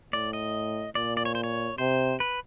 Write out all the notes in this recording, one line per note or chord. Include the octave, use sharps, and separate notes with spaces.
A2 D5
D#5
A#2 D5
D5
C#5
C5
C#5
C3 C5
B4